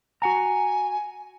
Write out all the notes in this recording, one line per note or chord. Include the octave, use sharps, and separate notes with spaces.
F#4 F#5 G#5 A#5